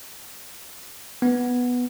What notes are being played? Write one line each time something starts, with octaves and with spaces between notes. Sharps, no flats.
B3